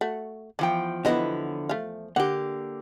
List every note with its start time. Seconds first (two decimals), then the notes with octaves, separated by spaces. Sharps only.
0.01 A3 F#4
0.59 E2 F3 E4 G5
1.05 D3 F#3 B3 E4 D#5
1.69 A3 F5
2.16 D3 A#3 G4 F#5